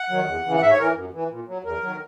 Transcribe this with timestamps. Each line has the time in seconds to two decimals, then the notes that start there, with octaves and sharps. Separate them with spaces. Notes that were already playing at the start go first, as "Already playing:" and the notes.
Already playing: F#5
0.10 D#3 F#3
0.27 E2
0.45 C#3 E3
0.56 F#5
0.61 G#2 E5
0.71 C#5
0.79 E3 A#4
0.96 F#2
1.14 E3
1.30 A#2
1.48 F#3
1.64 E2 A#4
1.82 D#3 F#3